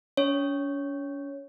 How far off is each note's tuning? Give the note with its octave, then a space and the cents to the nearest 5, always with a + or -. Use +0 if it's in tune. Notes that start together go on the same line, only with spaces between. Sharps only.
C#4 +40 C#5 +0